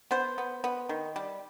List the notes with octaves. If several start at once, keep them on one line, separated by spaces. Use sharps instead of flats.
B3 C5
B3
B3
D#3
G3